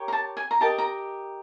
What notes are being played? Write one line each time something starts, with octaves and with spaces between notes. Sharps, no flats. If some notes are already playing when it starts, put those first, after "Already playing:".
Already playing: G4 A#4 C#5
A#5
A5
G#5
A#5
G4 A#4 D#5 A5
A#5